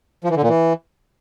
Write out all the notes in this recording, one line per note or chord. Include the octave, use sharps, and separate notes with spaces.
F3
E3
D3
A#2
E3